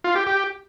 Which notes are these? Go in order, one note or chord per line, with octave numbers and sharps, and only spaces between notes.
F4
G4
G4